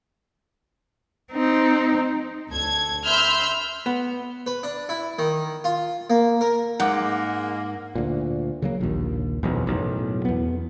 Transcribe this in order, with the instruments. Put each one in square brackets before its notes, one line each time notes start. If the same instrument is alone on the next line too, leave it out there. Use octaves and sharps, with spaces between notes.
[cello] C4 D#4
[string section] D2 A4 G#6
E5 B5 C6 E6 F6 G6
[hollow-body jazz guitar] B3
[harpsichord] B4
D4
E4
D#3
F4
A#3
A#4
[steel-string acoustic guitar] G#2 [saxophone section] G#3 A#3 [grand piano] F#5 D6
[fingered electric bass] D2 A#2
C#3 F#3 A#3
A#1 D#2
E1 B1 F2
B1 F#2 A2
E2 B3